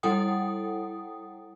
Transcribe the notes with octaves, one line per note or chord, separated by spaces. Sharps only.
G3 E4 A4 F#5 G5 D#6